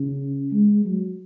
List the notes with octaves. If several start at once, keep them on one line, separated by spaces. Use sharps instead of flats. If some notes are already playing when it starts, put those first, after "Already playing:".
Already playing: C#3
G#3
F#3